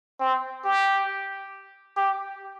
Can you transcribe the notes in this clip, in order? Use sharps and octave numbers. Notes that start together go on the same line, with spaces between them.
C4
G4
G4